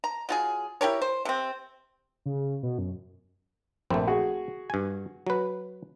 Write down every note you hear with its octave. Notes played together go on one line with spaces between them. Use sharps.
A#5
F#3 F4 G#4
E4 G4 A#4 C#5
C5
C3 C4
C#3
B2
F#2
A#1 A3 C4
F#4 G#4
G2 G#5
F#3 B4